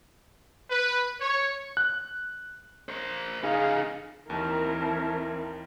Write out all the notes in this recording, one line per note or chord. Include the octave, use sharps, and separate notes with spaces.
B4
C#5
F#6
A#4 C5
C#3 D#4 G#4 F5
D#2 D#3 E3 C4 A#4 A5